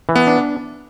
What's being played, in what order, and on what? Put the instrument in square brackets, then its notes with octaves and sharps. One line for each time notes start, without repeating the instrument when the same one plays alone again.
[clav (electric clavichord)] E3
[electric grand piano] B3
[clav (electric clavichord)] D4